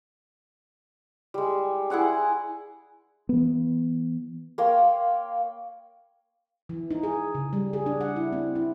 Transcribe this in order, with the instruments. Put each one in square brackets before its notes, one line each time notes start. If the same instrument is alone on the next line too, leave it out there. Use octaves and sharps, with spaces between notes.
[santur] G3 G#3
E4 G#4 F#5 G#5
[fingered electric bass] E3 B3
[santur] A#3 C#5 G5 C6
[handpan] E3
D#4
G#4
C#3
G3
G#4
D4
F#5
E4
C4
E4